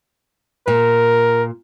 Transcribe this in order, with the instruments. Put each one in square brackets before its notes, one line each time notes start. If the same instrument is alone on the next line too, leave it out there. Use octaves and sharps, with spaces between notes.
[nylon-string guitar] A#2 [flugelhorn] A#4